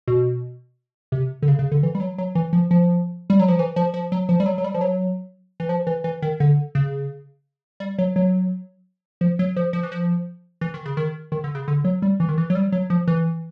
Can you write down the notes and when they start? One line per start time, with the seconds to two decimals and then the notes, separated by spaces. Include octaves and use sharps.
0.07 B2
1.12 C3
1.42 D3
1.48 C#3
1.59 C#3
1.72 D3
1.83 E3
1.95 G3
2.00 F#3
2.18 F#3
2.35 E3
2.53 F3
2.71 F3
3.30 G3
3.40 F#3
3.48 F3
3.59 E3
3.76 F3
3.94 F3
4.12 F#3
4.29 F3
4.40 G3
4.46 F#3
4.58 F#3
4.64 G3
4.74 F3
4.81 F#3
5.60 E3
5.69 F3
5.87 E3
6.04 E3
6.22 D#3
6.40 D3
6.75 C#3
7.80 G3
7.98 F#3
8.16 F#3
9.21 F3
9.39 F#3
9.56 F3
9.73 F3
9.83 E3
9.92 F3
10.61 E3
10.74 D#3
10.86 C#3
10.97 D#3
11.32 D#3
11.44 D3
11.55 C#3
11.68 D3
11.85 F#3
12.02 G3
12.20 E3
12.29 D#3
12.38 E3
12.50 F#3
12.55 G3
12.72 F#3
12.90 F3
13.08 E3